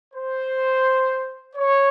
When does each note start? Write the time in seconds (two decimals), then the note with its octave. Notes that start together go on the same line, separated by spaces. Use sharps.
0.14 C5
1.56 C#5